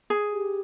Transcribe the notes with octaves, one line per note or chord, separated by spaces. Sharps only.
G#4
G4